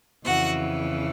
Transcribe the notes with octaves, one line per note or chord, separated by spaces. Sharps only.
F2 C#3 E3 F#4 F#5